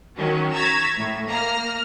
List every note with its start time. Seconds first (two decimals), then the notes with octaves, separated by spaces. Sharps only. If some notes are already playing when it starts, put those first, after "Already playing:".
0.17 D#3 F#3 C#4
0.53 A#5 C#6 E6 G#6 A6 B6
0.96 A2
1.27 A#3 A#5 F6